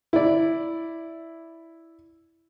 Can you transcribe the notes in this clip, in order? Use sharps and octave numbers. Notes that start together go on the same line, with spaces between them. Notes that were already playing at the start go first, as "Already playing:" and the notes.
E4 D5